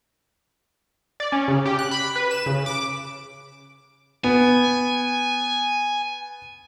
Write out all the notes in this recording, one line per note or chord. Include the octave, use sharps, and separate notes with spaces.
D5
C#4
C#3
G4
F#6
B5
B4
E7
C#3
D6
B3 G#5